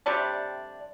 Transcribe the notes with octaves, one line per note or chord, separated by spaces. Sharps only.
C3 G3 A3 D4